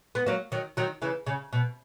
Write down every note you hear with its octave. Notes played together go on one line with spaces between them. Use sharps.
B3
F#3 A#3
D#3 F#3
D#3 F#3
C#3 E3
C#3
B2